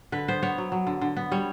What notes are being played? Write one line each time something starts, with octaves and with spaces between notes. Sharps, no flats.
D3 B4
B3 C5
B3 C#5
F#3
F#3
D3
D3
B3
G3 C#5